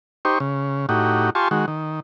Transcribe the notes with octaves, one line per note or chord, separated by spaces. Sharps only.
D#4 G4 C5 C#6
C#3
A2 D#4 F#4 G4
F4 G4 G#5 A5 C6 C#6
D#3 G#3 F#4
D#3